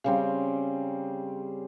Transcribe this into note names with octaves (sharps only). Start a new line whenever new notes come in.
C#3 G3 C4